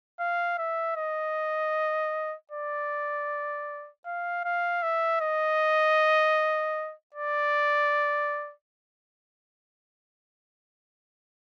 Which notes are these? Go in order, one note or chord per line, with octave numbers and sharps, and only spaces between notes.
F5
E5
D#5
D5
F5
F5
E5
D#5
D5